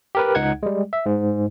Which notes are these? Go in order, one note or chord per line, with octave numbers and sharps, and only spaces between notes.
G4 A#4 B4
C#2 D#4 F#5 G#6
G3 G#3
E5
G#2